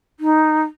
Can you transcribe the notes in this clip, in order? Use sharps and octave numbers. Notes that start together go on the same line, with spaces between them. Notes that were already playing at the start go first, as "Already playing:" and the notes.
D#4